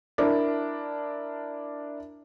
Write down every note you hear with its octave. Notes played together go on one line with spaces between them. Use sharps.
D4 E4 A#4 D5